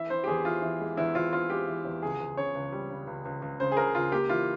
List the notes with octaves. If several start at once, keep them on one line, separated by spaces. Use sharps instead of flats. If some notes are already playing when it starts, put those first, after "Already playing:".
Already playing: E3 E5
E3 C5
G4
E2 G#4
E3 F4
E3
G#3
E2 E4
E2 F4
E2 F4
G#3 G4
E3
E2
C#2 G#4
C#2
C#3 C#5
C#2
G3
C#3
C#2
C#2
C#2
C#3 C5
G#4
C#2 A#4
C#2 F4
A#3 G4
E3 F4